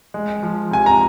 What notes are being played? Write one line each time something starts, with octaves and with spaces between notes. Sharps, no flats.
G#3
F3
C3 G#5
A#5